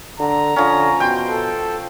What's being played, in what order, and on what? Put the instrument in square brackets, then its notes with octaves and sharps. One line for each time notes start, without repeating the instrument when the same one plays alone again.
[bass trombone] D3 [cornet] A#5
[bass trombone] D3 [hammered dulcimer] F3 C#4
[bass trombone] B2 [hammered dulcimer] G5 C6
[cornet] A4